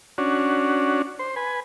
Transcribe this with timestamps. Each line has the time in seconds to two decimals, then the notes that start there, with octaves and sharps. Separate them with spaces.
0.18 C#4 D4 F#4
1.19 C5
1.36 B4 G#5